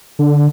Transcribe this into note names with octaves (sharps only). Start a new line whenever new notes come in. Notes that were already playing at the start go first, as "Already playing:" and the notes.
D3